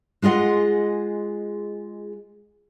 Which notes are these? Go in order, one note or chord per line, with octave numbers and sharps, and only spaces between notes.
G#3 F4 G#4 D#5 F#5